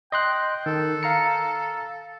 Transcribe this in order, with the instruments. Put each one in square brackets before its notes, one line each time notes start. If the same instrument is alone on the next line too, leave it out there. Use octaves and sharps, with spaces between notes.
[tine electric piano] D#5 C6 F#6 [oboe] G5
[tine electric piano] D#3 [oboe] A4
[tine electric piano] F5 A#5 C#7